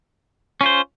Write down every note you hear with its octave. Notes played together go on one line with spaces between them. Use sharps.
C#4 F4 C5